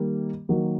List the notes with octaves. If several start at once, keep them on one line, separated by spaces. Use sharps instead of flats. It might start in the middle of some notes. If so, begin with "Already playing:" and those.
Already playing: D#3 G3 A#3
D#3 F#3 A#3